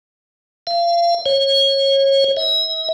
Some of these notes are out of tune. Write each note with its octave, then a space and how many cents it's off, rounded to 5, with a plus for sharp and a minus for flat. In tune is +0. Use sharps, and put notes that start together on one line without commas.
F5 -30
C#5 -25
E5 -40